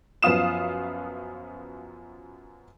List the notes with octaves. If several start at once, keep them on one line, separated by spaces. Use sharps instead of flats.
F#2 F3 B3 F5 D#6 E7